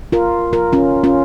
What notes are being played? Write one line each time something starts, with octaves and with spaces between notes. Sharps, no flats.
F4 A#4
F4 A#4
C#4 F4
C#4 F4